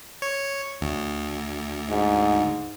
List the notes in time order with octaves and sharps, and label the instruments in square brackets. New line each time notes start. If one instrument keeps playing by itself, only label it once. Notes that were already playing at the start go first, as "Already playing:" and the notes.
[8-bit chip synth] C#5
D2
[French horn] G#2